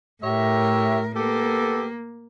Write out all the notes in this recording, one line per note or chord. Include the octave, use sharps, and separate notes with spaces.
A2 G4 A#4 C#5 E5
A#3 B3 G4 A4